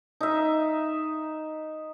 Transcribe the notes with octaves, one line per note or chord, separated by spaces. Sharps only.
D#4 E5